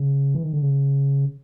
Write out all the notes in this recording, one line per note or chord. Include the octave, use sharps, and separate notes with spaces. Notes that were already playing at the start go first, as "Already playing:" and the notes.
Already playing: C#3
E3
D#3
D3
C#3